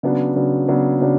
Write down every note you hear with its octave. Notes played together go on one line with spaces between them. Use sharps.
C#3 F#3 B3 D4
C#3 F#3 B3 D4
C#3 F#3 B3 D4
C#3 F#3 B3 D4